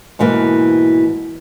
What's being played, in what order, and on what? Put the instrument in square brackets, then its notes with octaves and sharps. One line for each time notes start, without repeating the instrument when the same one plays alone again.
[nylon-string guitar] G#2 B2 E3 A#3